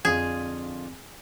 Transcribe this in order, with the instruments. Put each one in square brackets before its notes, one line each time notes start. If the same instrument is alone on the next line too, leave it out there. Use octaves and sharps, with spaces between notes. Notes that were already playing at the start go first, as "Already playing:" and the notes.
[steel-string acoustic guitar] F2 D3 F4 [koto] G#4